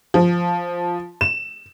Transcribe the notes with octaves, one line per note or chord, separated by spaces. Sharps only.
F3
E7